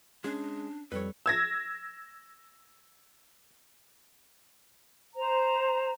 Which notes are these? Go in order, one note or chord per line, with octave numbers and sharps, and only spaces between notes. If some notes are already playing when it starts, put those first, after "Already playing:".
G#3 C#4 D4 G#4
F2 G3 A4 B4 C#5
E6 G#6 A#6
C5 A#5